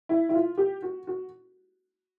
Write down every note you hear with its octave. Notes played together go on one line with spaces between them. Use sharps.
E4
E4
F4
G4
F#4
F#4